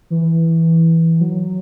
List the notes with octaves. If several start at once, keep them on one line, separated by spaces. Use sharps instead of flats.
E3
F#3